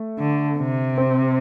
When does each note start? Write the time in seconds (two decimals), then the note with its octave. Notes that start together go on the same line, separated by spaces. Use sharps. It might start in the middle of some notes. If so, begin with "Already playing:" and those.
Already playing: A3
0.19 D3
0.58 C3
0.98 C4